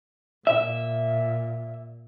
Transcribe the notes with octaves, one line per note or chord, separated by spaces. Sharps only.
A#2 E5